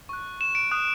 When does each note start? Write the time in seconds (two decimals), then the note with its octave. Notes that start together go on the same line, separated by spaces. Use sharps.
0.09 C#6 F#6
0.41 E7
0.55 D7
0.71 D#6 F#6